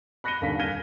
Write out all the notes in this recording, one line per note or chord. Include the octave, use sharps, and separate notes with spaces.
B5 F#6 A#6 C#7 D#7 G7
D#1 D#2 D3 D4 F5 B6
F6 G#6 A#6 D#7 G7